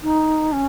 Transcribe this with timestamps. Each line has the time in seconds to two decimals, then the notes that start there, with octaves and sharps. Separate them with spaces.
0.03 D#4
0.52 C#4